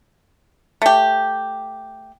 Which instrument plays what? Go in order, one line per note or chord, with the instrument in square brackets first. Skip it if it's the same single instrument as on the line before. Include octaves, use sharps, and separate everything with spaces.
[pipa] A3 G4